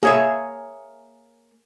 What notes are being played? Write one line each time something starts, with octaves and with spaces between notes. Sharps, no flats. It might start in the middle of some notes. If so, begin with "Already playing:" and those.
A#3 G#4 C#5 E5